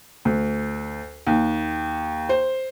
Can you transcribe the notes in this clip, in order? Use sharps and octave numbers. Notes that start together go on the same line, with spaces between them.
D2
D#2
C5